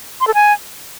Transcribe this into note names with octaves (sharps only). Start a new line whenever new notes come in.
C6
A4
G#5